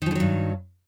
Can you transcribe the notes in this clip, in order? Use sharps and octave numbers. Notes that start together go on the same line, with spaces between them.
G2 D3 D#3 F3 F#3